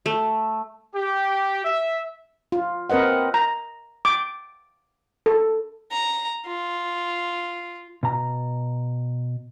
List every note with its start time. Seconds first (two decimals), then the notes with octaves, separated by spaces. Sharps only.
0.06 A3
0.95 G4
1.65 E5
2.52 F4
2.90 C4 A#4 B4 D#5 F#5
3.34 A#5
4.05 D6
5.26 A4
5.92 A#5
6.47 F4
8.03 B2 A#5